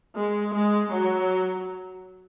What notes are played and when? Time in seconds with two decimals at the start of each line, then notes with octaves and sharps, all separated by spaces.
0.16 G#3
0.53 G#3
0.91 F#3